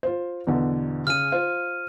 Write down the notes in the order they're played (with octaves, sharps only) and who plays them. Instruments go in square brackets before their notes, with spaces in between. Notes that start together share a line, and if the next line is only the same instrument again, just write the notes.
[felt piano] F4 C5
E2 B2 D3
[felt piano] C#3 G#4 [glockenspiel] F6 D#7
[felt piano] F4 C5 F5